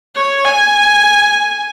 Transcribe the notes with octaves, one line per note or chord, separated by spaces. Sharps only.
C#5
G#5